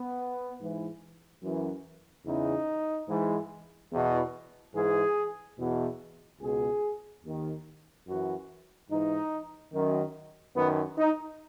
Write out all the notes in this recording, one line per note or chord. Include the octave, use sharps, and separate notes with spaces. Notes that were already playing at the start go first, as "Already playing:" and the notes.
Already playing: B3
G#2 E3
F#2 E3
E2 C#3 E3 D#4
G#2 E3
E2 B2
G#2 E3 G#4
E2 B2
C#2 B2 G#4
D#2 D#3
F#2 E3 F#4
G#2 E3 D#4
F#2 D#3
F#2 D#3 B3
D#4